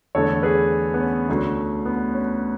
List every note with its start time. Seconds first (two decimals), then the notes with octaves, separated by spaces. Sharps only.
0.15 E2 D3 A3 A4 C#5
0.43 G#4 B4
0.94 B3
1.00 C#4
1.29 D2 D3 A3
1.85 B3
2.14 C#4